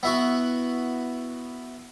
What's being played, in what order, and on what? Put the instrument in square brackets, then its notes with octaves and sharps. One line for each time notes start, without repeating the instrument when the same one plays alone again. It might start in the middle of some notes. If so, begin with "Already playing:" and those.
[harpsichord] B3 E4 F#4